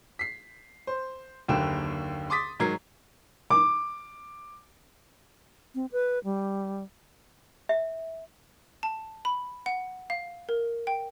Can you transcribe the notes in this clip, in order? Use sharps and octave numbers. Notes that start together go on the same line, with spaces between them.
B6 C7
C5
F#1 D#2 D3 G5 E7
C6 D6 D#6 A6 B6
G#2 D#3 F#3 A#4 G#6 C7
D6
C4
B4
G3
E5
A5
B5
F#5
F5
A#4
G5